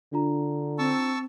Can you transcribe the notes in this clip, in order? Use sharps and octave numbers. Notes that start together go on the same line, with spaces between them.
D3 D4 F4 A#5
C4 A5 C#6 E6